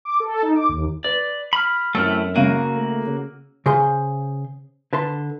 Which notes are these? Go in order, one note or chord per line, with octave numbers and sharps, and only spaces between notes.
D6
A4
D#4
D6
D#2
B4 D5
B5 F6
F#2 A3 C4 E4 E6 F6
C#3 A#3 F#4 F5 D#7
A3
C#3
C#3 G#4 C5 C6
D3 B4 A5 C6